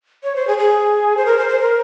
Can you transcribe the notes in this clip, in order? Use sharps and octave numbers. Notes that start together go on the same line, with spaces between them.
C#5
C5
G#4
G#4
C5
A#4
C5
C5
A#4